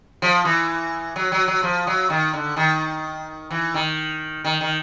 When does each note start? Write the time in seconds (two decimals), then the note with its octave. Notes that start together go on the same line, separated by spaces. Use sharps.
0.22 F3
0.45 E3
1.16 F#3
1.32 F#3
1.48 F#3
1.63 F3
1.87 F#3
2.10 D#3
2.33 D3
2.56 D#3
3.51 E3
3.74 D#3
4.44 D#3
4.61 D#3